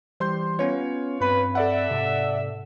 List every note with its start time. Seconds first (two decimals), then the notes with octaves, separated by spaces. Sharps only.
0.20 E3 G3 G4 C5 C6 G6
0.59 B3 C#4 F4 B4 C#5
1.21 G2 C4 B4 B5
1.55 A4 D5 E5 F#5
1.91 G#2 C3